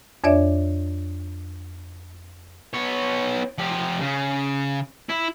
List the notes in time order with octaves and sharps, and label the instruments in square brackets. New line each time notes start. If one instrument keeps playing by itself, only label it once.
[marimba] F2 D4 C#5 D5 E5
[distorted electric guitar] B3 C#5
F3 G4
C#3
E4